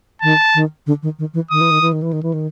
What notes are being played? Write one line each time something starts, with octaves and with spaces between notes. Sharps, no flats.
D#3 A5
D#3
D3
D#3
D#3
E3
D#3 D#6
E3
D#3
E3
D#3
E3
D#3
E3
D#3